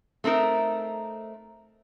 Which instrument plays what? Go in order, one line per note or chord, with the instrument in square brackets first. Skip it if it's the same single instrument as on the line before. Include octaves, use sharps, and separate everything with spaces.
[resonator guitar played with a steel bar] A3 C4 D#4 A#4